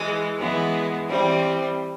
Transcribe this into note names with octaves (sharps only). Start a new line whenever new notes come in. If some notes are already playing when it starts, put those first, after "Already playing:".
Already playing: E3 G#3
E3 G#3 B3
E3 G3 C4